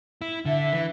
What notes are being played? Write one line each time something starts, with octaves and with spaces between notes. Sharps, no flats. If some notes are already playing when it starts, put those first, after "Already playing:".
E4
D3 E5
E3